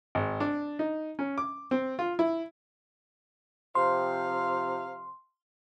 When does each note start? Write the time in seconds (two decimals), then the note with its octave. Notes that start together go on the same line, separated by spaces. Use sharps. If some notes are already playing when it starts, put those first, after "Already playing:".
0.15 G#1
0.40 D4
0.79 D#4
1.19 C#4
1.38 D6
1.71 C4
1.99 F4
2.19 E4
3.75 C3 F3 F5 C6